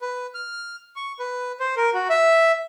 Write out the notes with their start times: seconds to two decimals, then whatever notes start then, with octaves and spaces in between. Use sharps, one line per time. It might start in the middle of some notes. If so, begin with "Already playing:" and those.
0.01 B4
0.34 F6
0.96 C#6
1.19 B4
1.60 C5
1.77 A#4
1.94 F#4
2.10 E5